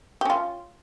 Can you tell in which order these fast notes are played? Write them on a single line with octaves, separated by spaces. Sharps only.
G4 C#4 F4